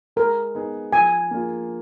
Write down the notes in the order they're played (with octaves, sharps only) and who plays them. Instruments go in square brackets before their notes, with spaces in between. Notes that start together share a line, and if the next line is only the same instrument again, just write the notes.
[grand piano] G#3 [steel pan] A#4
[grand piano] B3 D#4 G#4
[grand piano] F3 [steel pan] G#5
[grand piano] A#3 D4 F4 G#4